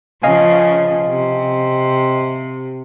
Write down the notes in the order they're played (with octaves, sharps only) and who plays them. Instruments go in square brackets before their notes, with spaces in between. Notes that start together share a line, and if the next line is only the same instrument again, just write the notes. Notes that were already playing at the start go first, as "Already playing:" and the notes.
[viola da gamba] C#3 F3 [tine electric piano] D#5 F5 G#5
[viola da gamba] C3